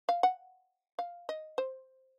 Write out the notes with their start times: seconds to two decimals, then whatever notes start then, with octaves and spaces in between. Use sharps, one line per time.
0.09 F5
0.23 F#5
0.99 F5
1.29 D#5
1.58 C5